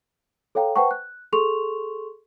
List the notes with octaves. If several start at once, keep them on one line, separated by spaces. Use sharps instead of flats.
A4 C#5 F5 G5 A#5
B4 C5 F#5 G5 A5 C#6
F#6
G#4 A4 C6 C#6 F7